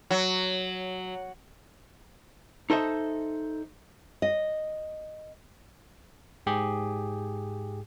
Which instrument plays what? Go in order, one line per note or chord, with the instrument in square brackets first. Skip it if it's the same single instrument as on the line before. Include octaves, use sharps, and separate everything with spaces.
[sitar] F#3
[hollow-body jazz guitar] D#4 A4 C5 D#5 E5
[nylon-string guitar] D#5
[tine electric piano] G#2 G4 G#4